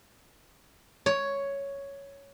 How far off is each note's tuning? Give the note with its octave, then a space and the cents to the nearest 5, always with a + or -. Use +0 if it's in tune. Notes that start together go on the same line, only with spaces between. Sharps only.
C#5 +5